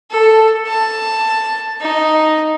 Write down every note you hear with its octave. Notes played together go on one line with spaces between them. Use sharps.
A4
A5
D#4